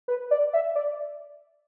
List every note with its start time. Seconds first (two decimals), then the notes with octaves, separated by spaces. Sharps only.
0.08 B4
0.31 D5
0.53 E5
0.75 D5